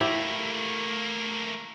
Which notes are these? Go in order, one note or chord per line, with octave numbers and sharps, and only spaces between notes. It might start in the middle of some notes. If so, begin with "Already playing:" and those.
A3 A#3 E4 G4